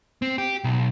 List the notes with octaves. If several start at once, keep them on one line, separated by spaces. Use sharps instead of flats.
C4
G4
B1